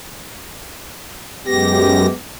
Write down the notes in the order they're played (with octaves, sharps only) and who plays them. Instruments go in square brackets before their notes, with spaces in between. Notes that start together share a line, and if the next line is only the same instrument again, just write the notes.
[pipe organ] F#2 A#6 [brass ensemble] G#3 B3 G4